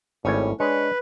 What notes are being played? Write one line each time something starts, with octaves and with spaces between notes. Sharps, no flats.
G#1 A2 G3 C#4 C#5
G#3 D4 B4 C#5